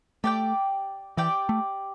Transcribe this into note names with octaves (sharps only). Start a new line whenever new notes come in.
A3 G4 D5 G5
E3 G4 D5 G5
A3